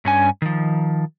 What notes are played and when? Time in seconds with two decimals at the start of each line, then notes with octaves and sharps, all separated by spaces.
0.05 G2 C#4 G#5
0.42 D#3 F3